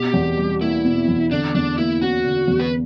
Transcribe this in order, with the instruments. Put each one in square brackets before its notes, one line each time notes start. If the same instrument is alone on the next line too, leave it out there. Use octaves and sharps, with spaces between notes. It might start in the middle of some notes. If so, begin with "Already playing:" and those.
Already playing: [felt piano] B2 [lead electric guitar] G4
[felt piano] E2
G3
[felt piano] A#3 [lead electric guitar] E4
[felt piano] B2
E2
[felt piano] D3 [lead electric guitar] D4
[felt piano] E2 [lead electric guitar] D4
[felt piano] A#3 [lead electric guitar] E4
[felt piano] C#4 [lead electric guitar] F#4
[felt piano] D3
E2
[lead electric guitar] B4